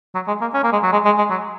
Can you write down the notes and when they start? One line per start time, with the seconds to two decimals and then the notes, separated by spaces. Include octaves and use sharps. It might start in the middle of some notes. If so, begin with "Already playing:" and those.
0.15 F#3
0.28 G#3
0.41 A#3
0.54 C#4
0.64 A#3
0.72 G#3
0.83 F#3
0.92 G#3
1.05 G#3
1.18 G#3
1.30 F#3